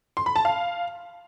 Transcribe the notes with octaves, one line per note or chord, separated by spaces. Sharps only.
C6
B5
A5
F5